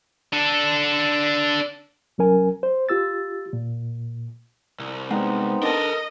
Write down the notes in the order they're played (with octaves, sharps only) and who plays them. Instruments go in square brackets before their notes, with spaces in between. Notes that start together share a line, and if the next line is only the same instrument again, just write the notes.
[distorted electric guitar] D4 A4
[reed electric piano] C2 F#3 C#4 A#4 G#5
C5
F4 G4 E6 A6
A#2
[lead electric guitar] C2
[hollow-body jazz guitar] G#3 F#5 [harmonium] B3 C4 D#4
[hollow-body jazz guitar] D4 A5 [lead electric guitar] A4 A#4 [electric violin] D#5